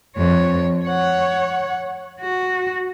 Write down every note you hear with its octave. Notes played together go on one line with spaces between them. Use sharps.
F2 C#5
C#5 F#5
F#4